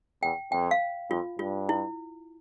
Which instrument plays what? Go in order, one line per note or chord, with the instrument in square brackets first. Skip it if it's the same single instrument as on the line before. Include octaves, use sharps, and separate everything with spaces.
[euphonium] E2 [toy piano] G5
[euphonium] F2 [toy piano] G5
[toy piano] F5
[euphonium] F2 [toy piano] F4
[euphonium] G2 [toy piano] F4
[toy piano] E4